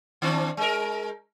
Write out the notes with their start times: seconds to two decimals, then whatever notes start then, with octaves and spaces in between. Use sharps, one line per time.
0.22 D#3 C4 D4
0.57 G#3 A#4